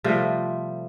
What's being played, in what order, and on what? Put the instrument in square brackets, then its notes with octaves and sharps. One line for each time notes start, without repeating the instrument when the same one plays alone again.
[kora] C3 F3 G3 A3